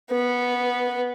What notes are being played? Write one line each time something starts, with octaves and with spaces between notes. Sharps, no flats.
B3